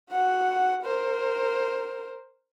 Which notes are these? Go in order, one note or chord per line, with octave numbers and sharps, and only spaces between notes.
F#4 F#5
A#4 C5